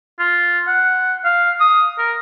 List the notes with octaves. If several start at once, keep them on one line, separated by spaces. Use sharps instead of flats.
F4
F#5
F5
D#6
A#4